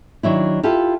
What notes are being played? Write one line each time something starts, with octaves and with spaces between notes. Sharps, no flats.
D#3 F#3 D4 E4
E4 F4 G4 A4